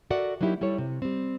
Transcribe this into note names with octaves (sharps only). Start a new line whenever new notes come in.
F#4 A4 A#4 D5 E5 F#5
F#3 A#3 D#4 E4 G4
G3 E4 A4 C#5
C3
G3 C4